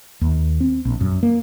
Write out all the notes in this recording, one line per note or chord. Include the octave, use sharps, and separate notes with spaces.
D#2
C4
A#1
F#2
A#3